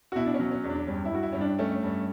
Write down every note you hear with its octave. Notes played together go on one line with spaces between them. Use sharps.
F#4
B2 E4
D4
C#4
F#3
C#4
E2
D4
G2 C#4
E4
G2 F#4
E4
G2 C#4
D4
A3 C#4
G2 C#4